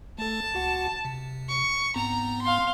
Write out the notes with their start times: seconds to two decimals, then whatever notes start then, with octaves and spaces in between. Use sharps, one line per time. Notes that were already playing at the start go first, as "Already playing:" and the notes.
0.19 A3 A4 A5
0.54 C#2 F#4 F#5
1.05 C3
1.48 C#6
1.96 G#2 B3 C4 A#5
2.42 F5 C6